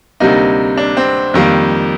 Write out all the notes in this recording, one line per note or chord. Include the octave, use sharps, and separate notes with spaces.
D2 C3 G3 A#3 D#4
D4
C4
F2 D#3 G3 A#3